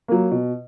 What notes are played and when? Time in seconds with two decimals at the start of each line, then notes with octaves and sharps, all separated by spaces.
0.08 F#3 A#3
0.31 B2